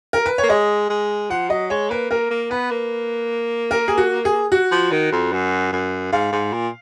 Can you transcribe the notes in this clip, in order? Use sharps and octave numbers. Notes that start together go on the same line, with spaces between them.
A#4
B4
C#5
A#3
G#3 D#5
G#3
F3 F#5
F#3 D#5
G#3 C#5
A#3 B4
A#3 A#4
A#3
B3 B4
A#3
A#4
G#4
F#4
G#4
F#4
F3
D#3
F2
F#2
F#2
G#2 F5
G#2
A#2